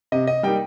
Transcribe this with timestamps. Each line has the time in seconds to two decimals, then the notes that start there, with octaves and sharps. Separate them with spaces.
0.12 C3 D#5
0.27 D#5
0.43 G3 A#3 D#4 G5